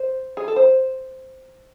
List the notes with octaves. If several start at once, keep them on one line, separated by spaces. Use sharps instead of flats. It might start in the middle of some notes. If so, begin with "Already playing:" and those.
Already playing: C5
G#4
A4
C5